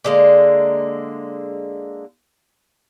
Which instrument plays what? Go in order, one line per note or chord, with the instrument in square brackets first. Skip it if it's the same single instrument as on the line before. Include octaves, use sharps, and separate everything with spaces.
[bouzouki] D3 G#3 A#3